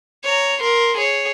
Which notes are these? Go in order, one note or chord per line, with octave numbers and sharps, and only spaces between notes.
C#5 A#5
A#4 C6
G#4 C#5